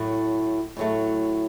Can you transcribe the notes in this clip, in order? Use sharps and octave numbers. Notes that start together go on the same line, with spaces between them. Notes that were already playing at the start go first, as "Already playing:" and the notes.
Already playing: A2 F#3 A3
A2 F#3 A3